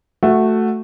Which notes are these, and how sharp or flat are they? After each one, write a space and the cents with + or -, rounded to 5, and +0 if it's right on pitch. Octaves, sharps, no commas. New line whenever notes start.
A3 +0 F#4 +0